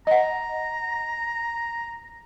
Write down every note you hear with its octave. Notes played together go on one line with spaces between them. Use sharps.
D#5 F#5 A#5